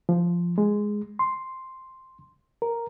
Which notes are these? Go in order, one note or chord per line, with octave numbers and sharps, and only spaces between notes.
F3
G#3
C6
A#4